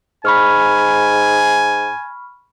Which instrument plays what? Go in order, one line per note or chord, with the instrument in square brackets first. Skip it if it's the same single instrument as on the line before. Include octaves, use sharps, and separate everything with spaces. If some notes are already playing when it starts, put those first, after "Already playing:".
[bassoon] G#2 [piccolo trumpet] G#5 [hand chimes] B5 C#6 F6